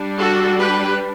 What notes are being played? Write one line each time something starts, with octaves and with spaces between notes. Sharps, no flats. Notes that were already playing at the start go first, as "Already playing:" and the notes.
Already playing: G3 D4
F#4 A4
G4 B4